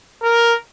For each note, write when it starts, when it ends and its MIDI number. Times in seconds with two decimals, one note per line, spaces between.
0.23 0.54 70